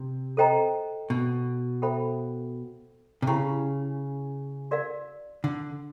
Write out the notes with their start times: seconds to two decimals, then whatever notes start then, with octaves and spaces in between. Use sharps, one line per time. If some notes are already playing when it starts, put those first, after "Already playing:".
Already playing: C3
0.37 A4 C5 D#5 G5 A#5
1.10 B2
1.82 A4 C5 E5 G5 B5
3.22 C3
3.27 C#3 C#4 E4 G4
4.71 F#4 A#4 D5 F5
5.44 D3